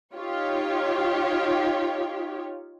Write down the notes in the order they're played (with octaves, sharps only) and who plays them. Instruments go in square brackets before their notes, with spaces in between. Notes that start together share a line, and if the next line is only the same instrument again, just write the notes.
[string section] D#4 F4 G4 C#5